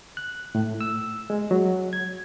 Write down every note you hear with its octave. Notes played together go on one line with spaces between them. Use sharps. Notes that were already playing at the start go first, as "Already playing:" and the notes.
F#6
A2
E6
G#3
F#3
G#6